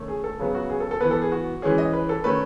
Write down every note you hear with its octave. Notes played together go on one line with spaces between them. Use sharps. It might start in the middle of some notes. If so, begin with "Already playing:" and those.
Already playing: D#3 A3 C#4
G#4
A4
C#3 F#3 B3 G#4
F#4
G#4
A4
A4
E3 B3 B4
A4
G#4
F#4
E3 G#3 C#4 G#4
D#5
B4
A4
D#3 A3 C#4 B4